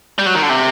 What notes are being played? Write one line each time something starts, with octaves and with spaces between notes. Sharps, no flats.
G3
F#3
D#3
D3
C3